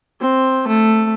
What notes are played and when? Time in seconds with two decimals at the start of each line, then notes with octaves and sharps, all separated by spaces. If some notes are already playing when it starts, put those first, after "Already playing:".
0.20 C4
0.67 A3